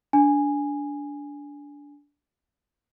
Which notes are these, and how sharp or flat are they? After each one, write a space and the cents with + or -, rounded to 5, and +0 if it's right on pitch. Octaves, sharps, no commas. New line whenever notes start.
D4 -20 G#5 -5